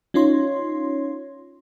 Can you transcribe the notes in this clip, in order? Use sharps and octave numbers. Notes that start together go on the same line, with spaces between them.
C#4 D#4 F4 C#5 C6